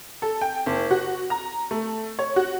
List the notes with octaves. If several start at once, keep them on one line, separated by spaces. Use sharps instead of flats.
A4
G5
F#1
F#4
A#5
A3
C#5
F#4